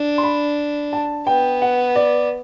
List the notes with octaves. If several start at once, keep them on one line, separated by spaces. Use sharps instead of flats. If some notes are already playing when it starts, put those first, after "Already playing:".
Already playing: D4
C6
B5
A5
B3 G5
F#5
D5